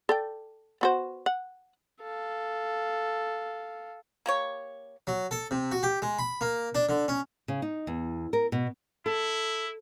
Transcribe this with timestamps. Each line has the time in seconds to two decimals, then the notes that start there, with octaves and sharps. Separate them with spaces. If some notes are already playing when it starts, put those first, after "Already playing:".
0.09 A4 D5 G5
0.81 B3 F#4 C5
1.26 F#5
2.02 A4 F5
4.26 A#3 G4 C#5
5.07 F#3
5.31 A4
5.51 C3
5.72 F#4
5.83 G4
6.02 G#3
6.19 B5
6.41 A#3
6.75 D4
6.89 D3
7.08 C#4
7.48 C#3
7.62 D#4
7.87 E2
8.33 A#4
8.52 B2
9.06 E4 A4